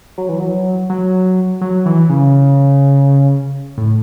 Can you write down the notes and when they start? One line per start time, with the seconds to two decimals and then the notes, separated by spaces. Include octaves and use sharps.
0.18 F#3
0.29 E3
0.40 F#3
0.90 F#3
1.61 F#3
1.86 E3
2.09 C#3
3.77 A2